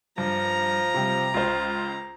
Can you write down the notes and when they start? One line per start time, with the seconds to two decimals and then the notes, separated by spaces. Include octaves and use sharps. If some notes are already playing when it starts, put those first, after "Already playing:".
0.18 G2 F3 A#5
0.94 C3 G3
1.34 C#2 F4 C5